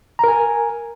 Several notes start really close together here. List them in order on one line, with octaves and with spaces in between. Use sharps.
A#5 A#4 G#5